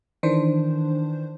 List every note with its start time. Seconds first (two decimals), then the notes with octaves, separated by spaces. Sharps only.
0.23 D#3 E3 D4 C5